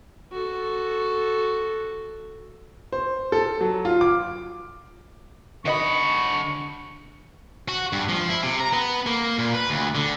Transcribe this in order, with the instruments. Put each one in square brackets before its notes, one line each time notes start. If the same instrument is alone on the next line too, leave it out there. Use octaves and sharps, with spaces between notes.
[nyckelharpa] F#4 A4
[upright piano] C5
A4
F#3
F4
D6
[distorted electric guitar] D3 B5 [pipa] D#3 F#4 D#5 [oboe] C#6
[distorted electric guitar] F#4
G2
F3
E4
C3
A#5
B3
A#3
A#2
B4
D2
D3